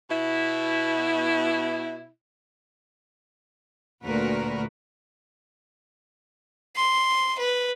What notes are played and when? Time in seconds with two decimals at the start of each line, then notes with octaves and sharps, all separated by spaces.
0.09 B2 E4
4.04 D2 A#2 F#4 A#4 B4
6.76 C6
7.39 B4